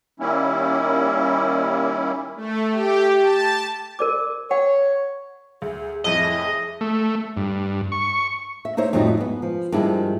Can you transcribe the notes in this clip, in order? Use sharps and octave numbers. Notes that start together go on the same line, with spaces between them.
D#3 G3 A#3 C#4 E4
A3
G4
A5
A#4 D5 D6
C#5 F#5
D2 G#4
C2 F2 A2 G#4 D#5
A3
G2
C#6
E5
D#4 E4 C5 C#5 E5
F2 A2 F#3 G3 B3 D#4
G#2 B3
F3
G2 D#3 F3 G#3 E4